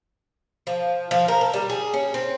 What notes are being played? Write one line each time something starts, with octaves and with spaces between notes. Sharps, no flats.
F3
F3
A#4
A4
G3
G#4
C#4
C4